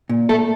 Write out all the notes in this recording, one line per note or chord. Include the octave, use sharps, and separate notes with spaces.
A#2
A#2 A3 A4